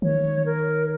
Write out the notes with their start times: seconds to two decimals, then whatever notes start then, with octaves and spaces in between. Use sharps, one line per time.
0.02 D#3 C#5
0.46 A#4